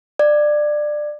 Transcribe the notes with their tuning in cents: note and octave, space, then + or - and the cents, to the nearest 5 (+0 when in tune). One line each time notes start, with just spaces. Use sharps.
D5 +20